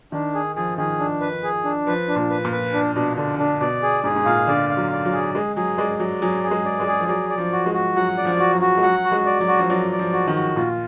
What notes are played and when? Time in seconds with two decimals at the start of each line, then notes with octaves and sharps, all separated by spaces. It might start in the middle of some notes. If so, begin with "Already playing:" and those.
0.12 D#3 D4
0.34 G#4
0.56 F3 G#4
0.78 D#3 G#4
1.00 D4
1.21 B4
1.43 G#4
1.64 D4
1.87 F3 B4
2.08 D4
2.16 A#2
2.30 B4
2.45 A#2
2.52 B4
2.73 D4
2.95 B2 D4
3.17 D3 D4
3.38 D3 D4
3.60 B2 D5
3.83 G#4
4.04 G#2 G#4
4.16 G#2
4.25 A#2 F5
4.47 D3 D5
4.70 F5
4.77 F#3
4.91 D5
5.05 F#3
5.12 G#4
5.35 G#3 G#4
5.56 F#3 G#4
5.78 G#3 D5
5.99 F#3 D5
6.21 F#3 G#4
6.43 G#4
6.51 G#3
6.65 D5
6.80 G#3
6.87 G#4
7.00 F3
7.08 F#3 D5
7.30 D5
7.38 F3
7.52 F#4
7.66 G#3
7.74 F#4
7.96 F#3 F#5
8.17 D5
8.25 F3
8.39 F#4
8.53 F#3
8.61 F#4
8.78 G#3
8.82 F#3 F#5
9.04 F#4
9.12 G#3
9.26 D5
9.41 F#3
9.48 F#4
9.58 F3
9.70 F#3 D5
9.92 D5
9.99 F3
10.13 F#4
10.27 D#3
10.35 F#4
10.56 A#2 F4